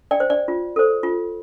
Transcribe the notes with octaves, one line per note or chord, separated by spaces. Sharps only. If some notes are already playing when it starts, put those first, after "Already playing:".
D5 G5
C5
D5
F4
A4 C5
F4